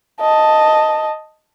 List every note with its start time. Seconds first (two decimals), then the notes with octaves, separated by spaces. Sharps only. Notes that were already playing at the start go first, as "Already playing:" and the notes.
0.20 D#5 A5